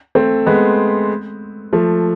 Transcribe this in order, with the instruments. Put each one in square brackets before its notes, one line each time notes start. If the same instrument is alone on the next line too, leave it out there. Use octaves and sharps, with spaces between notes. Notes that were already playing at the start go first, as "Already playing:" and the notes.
[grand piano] A3 C4
G#3 B3
F3 A3